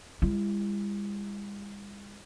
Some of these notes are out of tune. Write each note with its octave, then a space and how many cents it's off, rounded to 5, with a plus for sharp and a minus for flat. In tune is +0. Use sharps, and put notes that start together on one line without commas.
G#3 -45 E4 +35